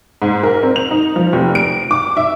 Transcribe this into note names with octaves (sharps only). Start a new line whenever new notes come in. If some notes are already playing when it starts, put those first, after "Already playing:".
G#2
A#4
C4
F7
D#4
F3
F1
D7
D6
E5